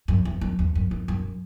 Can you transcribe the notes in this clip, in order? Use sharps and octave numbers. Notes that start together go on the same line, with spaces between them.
F#2
E2
F#2
E2
F#2
F#2
F#2